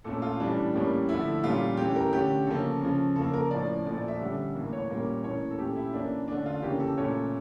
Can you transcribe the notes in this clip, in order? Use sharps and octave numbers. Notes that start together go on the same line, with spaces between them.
A#2 A3 C#4 A4
F4
A2 E3 G3 C#4 D4
A2 G3 A#3 C#4
D3 F3 A3 E4
A#2 G3 C#4 F4
E3 A3 C#4 G4
A#4
D3 A3 C#4 G4
C#3 F3 A#3 C#4 A4
C#3 F3 C#4
C#3 F3 A#3 A4
A#4
A2 F3 C#4 D5
A#2 F3 A3 D5
D5
E5
D3 G3 C#4
A2 E3 A#3
C#5
A#2 G3 A#3 C#4
A2 E3 A#3 C#4 C#5
A4
A#2 A3 C#4 G4
E4
E3 A#3 C#4 D4
D3 A3 C#4 D4
F4
C#3 E3 A#3 C#4 G4
A4
A#2 A3 C#4 C#5